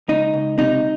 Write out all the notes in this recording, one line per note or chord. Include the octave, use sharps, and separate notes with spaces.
C#2 D#4
C#2
C3 D#4